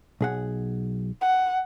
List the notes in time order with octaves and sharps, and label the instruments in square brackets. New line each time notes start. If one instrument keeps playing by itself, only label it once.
[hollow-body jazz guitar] B1 G#4 F#5
[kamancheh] F#5